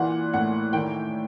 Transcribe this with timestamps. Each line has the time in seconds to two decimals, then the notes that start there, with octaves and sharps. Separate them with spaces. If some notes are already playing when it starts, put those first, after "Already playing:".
Already playing: A#2 E3 F#5
0.33 A2 F#5
0.73 D#3 G5